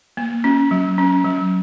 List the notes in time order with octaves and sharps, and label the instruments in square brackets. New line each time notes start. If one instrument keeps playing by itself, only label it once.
[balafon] A#3
C#4
F#3
C#4
F#3